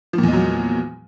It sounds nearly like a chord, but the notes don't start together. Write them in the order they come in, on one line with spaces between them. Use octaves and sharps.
F3 A#2 E2 G#3 F#3